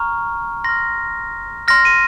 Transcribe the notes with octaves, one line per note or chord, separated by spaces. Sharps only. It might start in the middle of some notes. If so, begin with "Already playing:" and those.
Already playing: A#5 C#6 F6
C6 F6 A#6
C6 F6 A#6
D#7